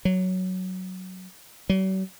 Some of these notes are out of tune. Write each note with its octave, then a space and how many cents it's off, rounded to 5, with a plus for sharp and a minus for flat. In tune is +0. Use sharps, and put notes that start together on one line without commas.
F#3 +5
F#3 +45